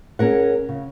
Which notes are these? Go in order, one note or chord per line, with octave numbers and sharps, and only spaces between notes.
C#4 G#4 A#4 F#5
C#3